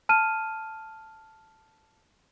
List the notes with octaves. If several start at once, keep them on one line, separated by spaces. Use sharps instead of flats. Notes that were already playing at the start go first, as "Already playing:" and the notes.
A5 F6 D#7